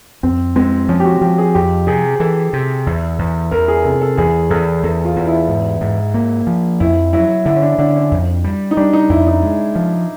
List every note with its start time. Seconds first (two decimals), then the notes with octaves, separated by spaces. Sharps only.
0.23 F2 C4
0.56 G#3 C4
0.89 F3 C#4
1.00 G4
1.05 F#4
1.21 F3 G4
1.38 G#4
1.54 F2 G4
1.87 C3 G#4
2.20 E3 A4
2.53 C3
2.87 E2
3.19 E2
3.51 E2 A#4
3.68 G#4
3.84 C3 A4
4.01 A4
4.17 E2 G#4
4.50 E2 A4
4.83 E2 A4
5.05 F4
5.16 E2
5.27 E4
5.49 G#2
5.81 G#2
6.14 A#3
6.47 F3
6.80 F2 E4
7.13 F#3 E4
7.46 D3 E4
7.56 C#4
7.62 D4
7.79 D3 D4
7.95 C#4
8.11 F2
8.44 G3
8.71 D#4
8.77 G3 D4
8.93 D#4
9.09 F2 E4
9.27 D#4
9.42 G#3
9.76 F3